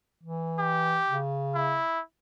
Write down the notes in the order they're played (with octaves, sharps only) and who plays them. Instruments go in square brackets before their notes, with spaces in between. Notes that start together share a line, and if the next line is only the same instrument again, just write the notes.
[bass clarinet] E3
[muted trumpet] G4
[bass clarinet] C#3
[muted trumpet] E4